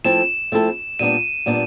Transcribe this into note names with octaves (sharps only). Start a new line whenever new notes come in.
F3 A3 C4 E4 A4 E7
F3 A3 C4 E4 A4
A#2 G3 B3 D4 D#7
A#2 G3 B3 D4